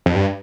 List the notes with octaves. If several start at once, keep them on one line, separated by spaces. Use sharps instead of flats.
F2
G2